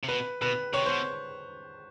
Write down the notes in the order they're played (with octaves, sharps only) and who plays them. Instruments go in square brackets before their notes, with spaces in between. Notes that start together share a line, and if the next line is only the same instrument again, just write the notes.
[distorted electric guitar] C3
[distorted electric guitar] B2 [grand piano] B4
[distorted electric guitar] B2 [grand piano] B4
[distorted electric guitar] C3 [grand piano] C#5
[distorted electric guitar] B2 [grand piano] C5